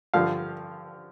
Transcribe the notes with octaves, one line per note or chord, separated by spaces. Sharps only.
G2 D3 F3 F5